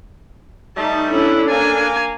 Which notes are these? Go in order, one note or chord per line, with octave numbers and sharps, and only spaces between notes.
G3 A3 D#4 A5
C#4 D4 E4 A4
A#3 G#5